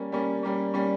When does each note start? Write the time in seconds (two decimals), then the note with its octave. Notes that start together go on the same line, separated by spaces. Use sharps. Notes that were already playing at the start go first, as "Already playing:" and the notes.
Already playing: G3 A#3 C#4
0.12 G3 A#3 C#4
0.43 G3 A#3 C#4
0.74 G3 A#3 C#4